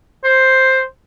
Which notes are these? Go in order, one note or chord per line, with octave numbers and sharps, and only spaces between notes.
C5